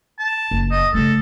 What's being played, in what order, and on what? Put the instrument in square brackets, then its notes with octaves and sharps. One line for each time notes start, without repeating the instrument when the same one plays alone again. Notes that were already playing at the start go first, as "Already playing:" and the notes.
[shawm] A5
[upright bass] F#1
[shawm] D#5
[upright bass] C#3 A3 [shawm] A4